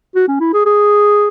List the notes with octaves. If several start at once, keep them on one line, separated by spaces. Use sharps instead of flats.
F#4
C#4
E4
G#4
G#4